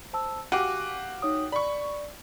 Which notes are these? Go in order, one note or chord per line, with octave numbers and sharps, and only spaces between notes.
C5 A5 E6
F#4 G4 F5 G#5 D6 D#7
D#4 C#5 D#6
D5 B5 C#6